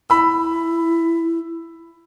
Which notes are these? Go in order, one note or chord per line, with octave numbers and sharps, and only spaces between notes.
E4 B5 E6